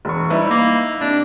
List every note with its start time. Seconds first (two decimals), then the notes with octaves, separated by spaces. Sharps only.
0.05 E1 C#6
0.30 G3 D#4 E4 B4
0.50 A#3
1.00 C3 D4 D5